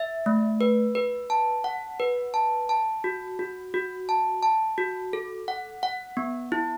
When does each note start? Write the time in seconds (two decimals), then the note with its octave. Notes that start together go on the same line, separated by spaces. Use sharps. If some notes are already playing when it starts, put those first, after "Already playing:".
Already playing: E5
0.26 A3
0.61 B4
0.95 B4
1.30 A5
1.64 F#5
2.00 B4
2.34 A5
2.69 A5
3.04 F#4
3.39 F#4
3.74 F#4
4.09 A5
4.43 A5
4.78 F#4
5.13 A4
5.48 F#5
5.83 F#5
6.17 B3
6.52 E4